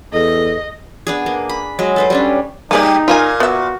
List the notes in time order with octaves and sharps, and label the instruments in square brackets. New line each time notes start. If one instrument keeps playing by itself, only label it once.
[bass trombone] E2 [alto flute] A4 [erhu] D#5
[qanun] B3 D4 G#4
A#3
B5
F#3 G#3
A4 B4 C5
G3 C#4 D4
[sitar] G3 G4 [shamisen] A#3 G#4 D5 [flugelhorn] D#4
[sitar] A#2 [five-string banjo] F4 A#4 G#5
[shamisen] B3 E5 [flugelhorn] F#4